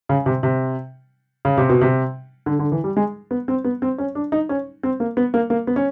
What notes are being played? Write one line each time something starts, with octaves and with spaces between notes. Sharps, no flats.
C#3
C3
C3
C#3
C3
B2
C3
D3
D3
E3
G3
G#3
B3
C4
B3
C4
C#4
D4
D#4
C#4
C4
A#3
B3
A#3
A#3
B3
C#4